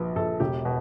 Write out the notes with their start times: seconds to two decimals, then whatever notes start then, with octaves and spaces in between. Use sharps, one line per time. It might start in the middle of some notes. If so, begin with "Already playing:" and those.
Already playing: A#1 F3 B4
0.16 A#1 A4
0.40 E1 G4
0.65 B2